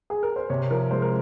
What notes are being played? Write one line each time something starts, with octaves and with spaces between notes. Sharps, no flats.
G#4
A#4
C5
C3 C#5
F3 A#4
G#3 C5
A#4